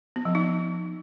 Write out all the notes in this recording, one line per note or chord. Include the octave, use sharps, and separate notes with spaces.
B3
F3
D#4